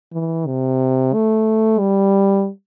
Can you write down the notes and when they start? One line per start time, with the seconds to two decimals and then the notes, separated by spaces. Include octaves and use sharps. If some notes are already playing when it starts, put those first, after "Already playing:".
0.13 E3
0.47 C3
1.14 A3
1.79 G3